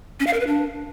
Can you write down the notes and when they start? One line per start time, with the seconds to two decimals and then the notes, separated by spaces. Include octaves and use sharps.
0.20 C#4
0.27 F5
0.33 A#4
0.40 B4
0.47 D4